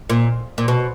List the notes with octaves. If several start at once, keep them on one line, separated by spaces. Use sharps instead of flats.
A#2
A#2
B2